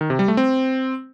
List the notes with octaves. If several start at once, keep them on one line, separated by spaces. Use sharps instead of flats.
D#3
C3
G3
A3
C4